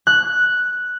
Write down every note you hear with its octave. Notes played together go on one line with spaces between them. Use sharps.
F#6